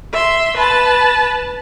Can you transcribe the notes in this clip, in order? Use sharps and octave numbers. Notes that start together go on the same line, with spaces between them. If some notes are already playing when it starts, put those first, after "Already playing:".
E5 C6
B4 A5